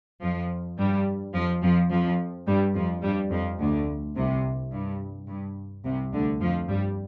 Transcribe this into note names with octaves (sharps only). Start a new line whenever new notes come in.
F2 F3
G2 G3
F2 F3
F2 F3
F2 F3
G2 G3
F2 F3
G2 G3
F2 F3
D2 D3
C2 C3
G2
G2
C2 C3
D2 D3
F2 F3
G2 G3